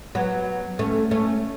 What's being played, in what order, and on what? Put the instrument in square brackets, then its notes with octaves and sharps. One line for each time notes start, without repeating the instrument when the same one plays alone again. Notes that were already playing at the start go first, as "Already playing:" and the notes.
[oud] F#3 B3
A3 C#4
A3 C#4